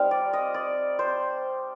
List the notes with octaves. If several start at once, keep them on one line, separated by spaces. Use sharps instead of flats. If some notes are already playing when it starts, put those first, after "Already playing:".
Already playing: G3 C4 D#4 F5
D5
D#5
D5
C5